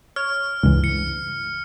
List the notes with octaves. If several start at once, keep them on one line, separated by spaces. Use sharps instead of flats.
C#5 F6
C#2 G2 E3
C#7